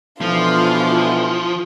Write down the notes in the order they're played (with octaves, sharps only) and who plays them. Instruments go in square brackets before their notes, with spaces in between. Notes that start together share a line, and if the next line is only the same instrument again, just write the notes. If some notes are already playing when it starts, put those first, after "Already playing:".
[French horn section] B2 E3 [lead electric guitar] F3 [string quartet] D4 F4 A4